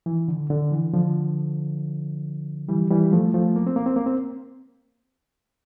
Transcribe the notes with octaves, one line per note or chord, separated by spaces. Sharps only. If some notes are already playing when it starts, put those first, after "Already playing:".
E3
D3
D3
E3
D3 F3
E3 G3
E3 G3
F3 A3
F3 A3
A#3
C4
A#3
C4
A#3
C4